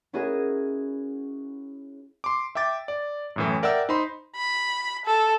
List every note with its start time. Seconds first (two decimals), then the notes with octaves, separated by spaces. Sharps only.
0.13 C#4 E4 F#4 G#4 A#4 D#5
2.24 C6 D6
2.55 E5 G5 D6 A6
2.88 D5
3.36 F#2 A2 E3
3.63 A#4 D5 E5 F#5 G5 E6
3.89 D#4 C5 B5 C6
4.36 B5
5.05 A4